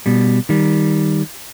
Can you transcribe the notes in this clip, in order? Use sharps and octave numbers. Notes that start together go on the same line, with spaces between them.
B2 G3
D#3 G3